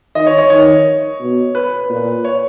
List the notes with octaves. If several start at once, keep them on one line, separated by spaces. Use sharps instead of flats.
D#3 D#5
C#5
C#5
D#3 C#5
B2
B4
A#2
C#5